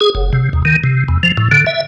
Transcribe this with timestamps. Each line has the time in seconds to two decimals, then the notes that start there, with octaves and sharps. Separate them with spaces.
0.01 G#4
0.15 F#1
0.33 C3
0.53 D#2
0.65 D#3
0.84 C3
1.08 E2
1.23 F3
1.37 A2
1.51 D3
1.66 E5